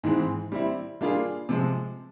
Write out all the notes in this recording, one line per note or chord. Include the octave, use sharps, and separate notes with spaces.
G#2 E3 G#3 C4
G3 C4 E4
G3 A#3 D4 F4 G#4
C3 F3 G#3